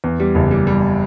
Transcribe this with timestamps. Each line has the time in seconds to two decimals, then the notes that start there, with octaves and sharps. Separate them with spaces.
0.04 E2
0.20 G3
0.35 F#1
0.51 G3
0.67 G3